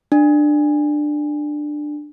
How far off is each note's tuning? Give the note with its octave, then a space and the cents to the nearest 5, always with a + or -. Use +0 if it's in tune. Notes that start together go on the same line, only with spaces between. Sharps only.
D4 +15